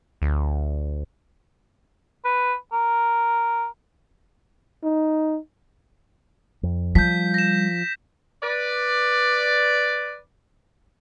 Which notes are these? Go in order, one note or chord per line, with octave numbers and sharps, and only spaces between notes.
D2
B4
A#4
D#4
F2
F3 G3 G6 B6
A#6 E7
B4 D5